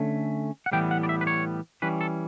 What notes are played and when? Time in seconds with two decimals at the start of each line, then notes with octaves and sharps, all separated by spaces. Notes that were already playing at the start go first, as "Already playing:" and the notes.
Already playing: D3 A3 C#4
0.66 F#5
0.72 A2 E3 G3 B3 G5
0.91 F#5
1.03 D5
1.09 E5
1.21 B4
1.27 C#5
1.82 E3 G3 C#4 B4
2.01 A4